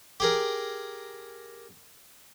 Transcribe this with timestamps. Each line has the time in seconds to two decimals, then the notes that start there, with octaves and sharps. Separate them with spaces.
0.20 G4 G#4 A#4